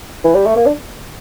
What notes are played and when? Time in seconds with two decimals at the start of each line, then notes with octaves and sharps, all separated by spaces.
0.24 E3
0.35 G3
0.46 A3
0.56 A#3
0.66 D4